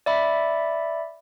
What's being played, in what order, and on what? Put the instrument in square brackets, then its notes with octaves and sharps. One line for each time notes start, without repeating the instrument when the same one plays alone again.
[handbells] D5 E5 B5